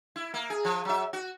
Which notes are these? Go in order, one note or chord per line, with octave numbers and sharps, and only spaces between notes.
E4
A#3
G#4
F3
F#3 E5
F#4